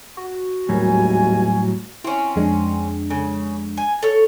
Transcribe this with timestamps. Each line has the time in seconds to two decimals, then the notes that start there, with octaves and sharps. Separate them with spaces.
0.17 F#4
0.69 G#1 D#2 A2 F#3 G3 G#5
2.04 C4 C#4 E4
2.36 F2 G#3 D4
3.10 C#3
3.77 G#5
4.03 A4 C#5